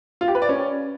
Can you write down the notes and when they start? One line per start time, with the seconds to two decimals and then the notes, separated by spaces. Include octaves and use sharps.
0.21 F4
0.28 G4
0.35 B4
0.42 D5
0.49 C#4